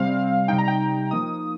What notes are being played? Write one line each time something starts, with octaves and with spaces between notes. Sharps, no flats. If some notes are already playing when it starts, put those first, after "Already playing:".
Already playing: C3 G3 C4 F5
C3 G3 D#4 G5
A#5
G5
F3 A#3 D#4 D#6